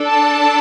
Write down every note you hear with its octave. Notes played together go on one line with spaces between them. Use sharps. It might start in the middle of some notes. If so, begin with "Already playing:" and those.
Already playing: D4 A4
A5